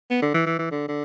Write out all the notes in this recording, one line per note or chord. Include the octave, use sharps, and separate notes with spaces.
B3
D3
E3
E3
E3
D3
D3